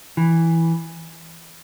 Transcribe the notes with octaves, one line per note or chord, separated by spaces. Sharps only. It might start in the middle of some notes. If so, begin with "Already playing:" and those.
E3